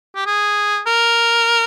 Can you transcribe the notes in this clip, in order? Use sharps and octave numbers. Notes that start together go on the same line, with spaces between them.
G4
G#4
A#4